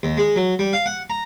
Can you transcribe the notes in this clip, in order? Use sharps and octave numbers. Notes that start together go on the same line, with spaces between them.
D#2
G#3
F#3
G3
F5
F#5
A#5